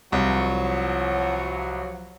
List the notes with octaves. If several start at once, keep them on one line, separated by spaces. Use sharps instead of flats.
C2 F3 F#3